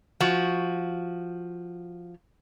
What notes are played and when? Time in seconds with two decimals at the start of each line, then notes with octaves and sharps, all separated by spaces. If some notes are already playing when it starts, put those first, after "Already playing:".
0.20 F3 F#4